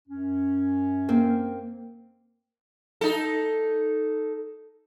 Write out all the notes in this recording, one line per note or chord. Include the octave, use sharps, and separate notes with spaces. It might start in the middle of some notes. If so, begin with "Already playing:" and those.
F#2 C#4
A#3 C4
D#4 A4